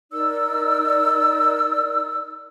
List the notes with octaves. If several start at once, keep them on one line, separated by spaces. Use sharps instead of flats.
D#4 A#4 D5 E6